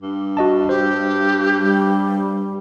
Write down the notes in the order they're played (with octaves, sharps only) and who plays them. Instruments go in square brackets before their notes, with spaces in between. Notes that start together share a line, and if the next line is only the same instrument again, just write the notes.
[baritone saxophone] G2
[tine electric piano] F#4 D#5 A5
[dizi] G4 [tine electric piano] C5
[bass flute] G3